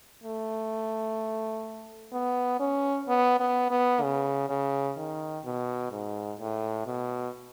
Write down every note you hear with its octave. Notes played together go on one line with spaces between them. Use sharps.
A3
B3
C#4
B3
B3
B3
C#3
C#3
D#3
B2
G#2
A2
B2